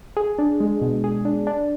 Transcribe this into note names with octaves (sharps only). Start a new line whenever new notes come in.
G#4
D4
G#3
B2
G#4
D4
D4